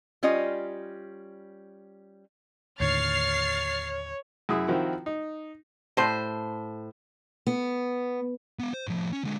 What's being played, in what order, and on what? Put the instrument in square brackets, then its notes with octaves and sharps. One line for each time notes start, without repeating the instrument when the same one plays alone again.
[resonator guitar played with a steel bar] G3 C#4 F4 D#5
[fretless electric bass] D#2 A2 D3 [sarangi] C#5 [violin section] F6 A6 C7
[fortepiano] F#2 E4 G#4 D#6
D#3 F3 C4 E4 F#4 A#4
D#4
[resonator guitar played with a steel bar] A2 C5
[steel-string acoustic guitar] B3
[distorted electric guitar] B3 F5
C5
A2 F3
C#4
D3 G#3